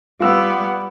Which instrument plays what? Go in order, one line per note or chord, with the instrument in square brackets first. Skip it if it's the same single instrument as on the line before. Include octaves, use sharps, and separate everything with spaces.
[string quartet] G3 B3 [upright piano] F4 E6